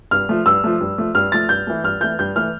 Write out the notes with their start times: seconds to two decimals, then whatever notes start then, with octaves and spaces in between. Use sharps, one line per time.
0.11 G2 F6
0.29 F3 A3
0.46 G2 E6
0.64 F3 A3
0.81 G2
0.98 F3 A3
1.15 G2 F6
1.32 F3 A3 A6
1.49 G2 G6
1.67 E3 A3
1.83 G2 F6
2.01 E3 A3 G6
2.19 G2 G6
2.36 E3 A3 F6